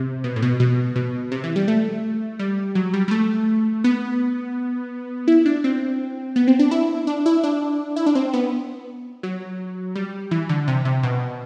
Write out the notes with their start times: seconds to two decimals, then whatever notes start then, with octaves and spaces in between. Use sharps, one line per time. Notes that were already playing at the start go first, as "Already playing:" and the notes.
Already playing: C3
0.24 B2
0.36 A2
0.42 B2
0.60 B2
0.96 B2
1.32 C3
1.44 E3
1.56 G3
1.68 A3
2.39 G3
2.75 F#3
2.94 G3
3.08 G3
3.11 A3
3.84 B3
5.28 E4
5.46 D4
5.64 C4
6.36 B3
6.48 C4
6.59 D4
6.71 E4
7.07 D4
7.26 E4
7.44 D4
7.96 E4
8.06 D4
8.15 C4
8.33 B3
9.23 F#3
9.95 G3
10.31 E3
10.49 D3
10.68 C3
10.85 C3
11.03 B2